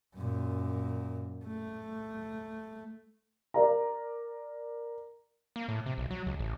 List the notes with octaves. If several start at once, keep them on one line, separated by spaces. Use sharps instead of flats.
F#2 A#2
A3
A#4 D5 A#5
A#3
A2
C3
B1
F#3
C#2
A1